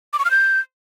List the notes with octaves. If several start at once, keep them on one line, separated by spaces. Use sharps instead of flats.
D6
C#6
F6
G6